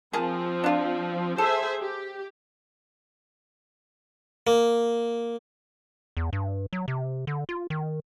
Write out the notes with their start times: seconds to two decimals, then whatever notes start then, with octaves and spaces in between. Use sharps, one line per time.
0.13 F3 C4 G#4 A#4 A5
0.64 D4 F4
1.38 G#4 A4 C5 E5
1.80 G4
4.47 A#3
6.17 E2
6.33 G2
6.73 F#3
6.88 C3
7.27 D3
7.49 F4
7.70 D#3